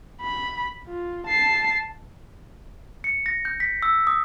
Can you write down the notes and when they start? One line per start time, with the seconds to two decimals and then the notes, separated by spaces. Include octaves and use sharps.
0.21 B5
0.88 F4
1.27 A5 C7
3.04 C#7
3.26 A#6
3.45 G6
3.60 B6
3.82 E6
4.07 D#6